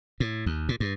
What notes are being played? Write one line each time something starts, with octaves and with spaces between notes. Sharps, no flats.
A2
D#2
A#2
G2